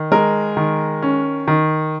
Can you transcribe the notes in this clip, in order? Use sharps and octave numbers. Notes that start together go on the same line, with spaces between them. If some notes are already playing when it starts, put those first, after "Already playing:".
Already playing: D#3
G#3 A#4
D#3
C#4
D#3